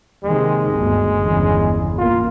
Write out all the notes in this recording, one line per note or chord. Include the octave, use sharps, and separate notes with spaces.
D#2 C3 D#3 G#3
G1 D2
G1 E2 C#3
A1 A#3 F4